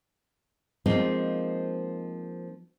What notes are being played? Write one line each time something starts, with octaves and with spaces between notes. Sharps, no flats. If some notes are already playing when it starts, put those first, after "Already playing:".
F3 G#3 A#3 C4 D#4 F4